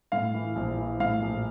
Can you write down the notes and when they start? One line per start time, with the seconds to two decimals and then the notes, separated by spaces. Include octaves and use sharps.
0.12 A2 F5
0.34 E3
0.56 A#1
0.78 E3
1.00 A2 F5
1.22 A#1